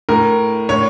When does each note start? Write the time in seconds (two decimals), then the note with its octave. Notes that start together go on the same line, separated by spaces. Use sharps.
0.09 A2 A#4
0.69 A2 C#5